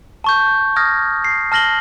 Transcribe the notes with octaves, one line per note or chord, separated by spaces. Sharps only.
A5 C#6 G6
D#6 F6 G#6 A#6
C7
A5 F6 A#6 F#7 G7